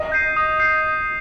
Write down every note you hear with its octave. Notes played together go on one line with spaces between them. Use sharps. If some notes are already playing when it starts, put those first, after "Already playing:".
Already playing: D#5
G6 C7 D#7
D#6
G6 C7